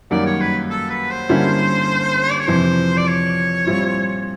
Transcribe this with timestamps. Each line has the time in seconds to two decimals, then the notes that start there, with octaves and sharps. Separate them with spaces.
0.11 F#2 D#3 G3 A#3 D5
0.26 C#5
0.41 B4
0.70 A4
0.90 B4
1.10 C5
1.29 D3 G3 A#3 C#4 E4
2.31 D5
2.39 C#5
2.48 F2 C3 E3 C5
2.97 D5
3.07 C#5
3.67 A#2 G3 C4 E4